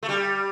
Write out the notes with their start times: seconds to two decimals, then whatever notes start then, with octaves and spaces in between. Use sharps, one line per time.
0.03 A3
0.09 G3